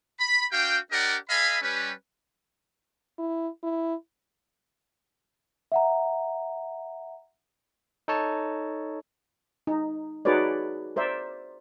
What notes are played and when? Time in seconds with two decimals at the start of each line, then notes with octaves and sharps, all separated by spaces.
0.19 B5
0.52 D4 F#4 F5 G5
0.91 D4 G4 A#4 D5 D#5 F#5
1.28 A4 D#5 F5 G#5 B5
1.61 G3 C#4 B4
3.18 E4
3.63 E4
5.72 E5 F#5 A#5
8.08 D#4 A4 C#5 A5
9.67 D#4
10.25 D#4 F#4 G#4 B4 C#5 D5
10.96 A#4 C5 D5 E5